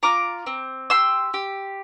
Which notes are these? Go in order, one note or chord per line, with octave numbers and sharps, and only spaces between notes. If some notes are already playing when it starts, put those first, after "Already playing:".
F4 A#5 D6
C4
G4 C6 E6
G4